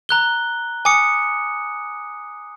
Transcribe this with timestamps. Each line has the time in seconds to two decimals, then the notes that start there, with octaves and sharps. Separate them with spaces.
0.09 A#5 F#6 G7
0.85 G#5 D6 D#6 C#7